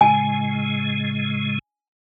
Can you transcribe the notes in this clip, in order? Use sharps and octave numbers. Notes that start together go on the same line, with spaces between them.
A2 C#3 G#3 G#5